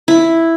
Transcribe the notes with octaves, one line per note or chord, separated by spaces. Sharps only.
E4